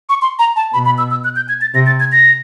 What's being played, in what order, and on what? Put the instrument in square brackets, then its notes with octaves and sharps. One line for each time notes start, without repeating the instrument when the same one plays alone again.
[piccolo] C#6
C6
A#5
A5
[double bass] B2 [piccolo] B5
[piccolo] B5
E6
E6
F#6
G6
G#6
A6
[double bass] C3 [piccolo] A#6
[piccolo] A6
G#6
A#6